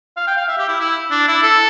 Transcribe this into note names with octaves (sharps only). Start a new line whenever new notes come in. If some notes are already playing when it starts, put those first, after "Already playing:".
F5
G5
F5
E5
G4
E4
E4
D4
E4
A4